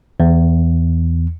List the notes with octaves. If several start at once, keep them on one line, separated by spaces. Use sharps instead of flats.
E2